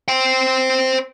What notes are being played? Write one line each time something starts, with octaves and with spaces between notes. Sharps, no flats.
C5 G5